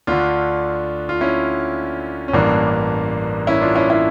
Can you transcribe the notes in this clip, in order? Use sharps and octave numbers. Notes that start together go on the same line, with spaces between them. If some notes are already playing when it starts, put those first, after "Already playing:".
D2 D3 D4 F4
F4
C#4 E4
C#4
A1 G2 E3 A#3 D4
C#4 E4
D4 F4
C#4 E4
C#4 E4